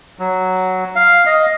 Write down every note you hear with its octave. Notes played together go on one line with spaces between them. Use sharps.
F#3
F5
D#5